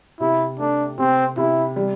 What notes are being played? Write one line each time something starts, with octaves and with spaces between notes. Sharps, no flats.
C3 E4
A3 D4
C3 C4
C3 E4
G3